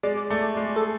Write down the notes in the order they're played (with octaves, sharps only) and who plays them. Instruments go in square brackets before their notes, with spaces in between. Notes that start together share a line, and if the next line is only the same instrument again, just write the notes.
[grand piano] G#3 [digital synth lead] D5
[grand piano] A3
G#3
[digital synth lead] A4